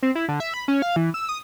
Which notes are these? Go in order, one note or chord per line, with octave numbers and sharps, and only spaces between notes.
C4
E4
D3
E5
B5
C#4
F5
E3
E6
D#6